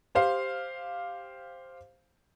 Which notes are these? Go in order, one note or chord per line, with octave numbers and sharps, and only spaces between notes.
G4 C5 F5